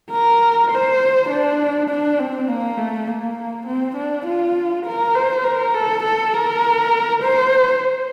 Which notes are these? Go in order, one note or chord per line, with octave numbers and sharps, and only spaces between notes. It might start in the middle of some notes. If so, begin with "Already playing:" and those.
A#4
C5
D4
D4
C4
A#3
A3
A#3
C4
D4
F4
A#4
C5
A#4
A4
A4
A#4
C5